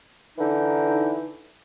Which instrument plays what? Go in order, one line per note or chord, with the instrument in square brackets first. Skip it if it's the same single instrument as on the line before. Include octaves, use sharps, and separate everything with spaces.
[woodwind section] D3 E3 D#4